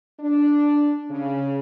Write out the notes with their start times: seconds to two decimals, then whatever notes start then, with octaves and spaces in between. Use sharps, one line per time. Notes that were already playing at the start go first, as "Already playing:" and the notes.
0.20 D4
1.10 C#3